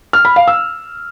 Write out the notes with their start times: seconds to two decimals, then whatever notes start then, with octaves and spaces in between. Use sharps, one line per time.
0.13 F6
0.25 B5
0.36 F5
0.48 E6